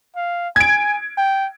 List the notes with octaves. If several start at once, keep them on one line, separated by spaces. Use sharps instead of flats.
F5
G#5 G#6 D7
G5